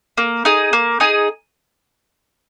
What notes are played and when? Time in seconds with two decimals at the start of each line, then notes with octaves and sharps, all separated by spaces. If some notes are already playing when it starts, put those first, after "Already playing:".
0.17 A#3
0.45 D#4 G#4
0.73 A#3
1.00 D#4 G#4